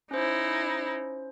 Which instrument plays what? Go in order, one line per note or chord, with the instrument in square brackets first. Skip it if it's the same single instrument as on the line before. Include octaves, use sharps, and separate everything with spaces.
[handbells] C#4 C5 [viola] D#4 E4